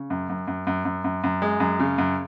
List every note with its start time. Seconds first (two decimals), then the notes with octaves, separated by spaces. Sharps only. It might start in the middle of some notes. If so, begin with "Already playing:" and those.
Already playing: C#3
0.10 F#2
0.29 F#2
0.47 F#2
0.67 F#2
0.85 F#2
1.04 F#2
1.24 F#2
1.42 G#3
1.60 F#2
1.79 C#3
1.98 F#2